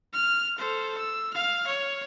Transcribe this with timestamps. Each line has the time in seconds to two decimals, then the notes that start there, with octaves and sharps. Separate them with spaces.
0.14 F6
0.58 A4 C5
0.98 E6
1.33 F5 F6
1.67 C#5